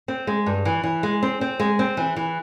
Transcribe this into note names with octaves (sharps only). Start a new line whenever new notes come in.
C4
G#3
G2
E3
E3
G#3
C4
C4
G#3
C4
E3
E3